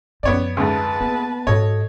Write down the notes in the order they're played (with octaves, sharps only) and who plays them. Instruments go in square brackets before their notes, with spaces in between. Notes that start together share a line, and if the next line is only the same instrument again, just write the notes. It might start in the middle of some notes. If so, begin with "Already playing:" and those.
[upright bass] F#2 F3 [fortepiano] B3 C#5 D5
[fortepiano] D2 G#2 [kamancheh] B4 A5
[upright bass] A#3 [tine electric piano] B3
[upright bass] G#2 [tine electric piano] F#4 A4 D#5 [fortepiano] C#5